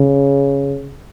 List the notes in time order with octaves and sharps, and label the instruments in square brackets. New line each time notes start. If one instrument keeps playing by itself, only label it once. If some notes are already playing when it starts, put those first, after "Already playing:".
Already playing: [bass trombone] C#3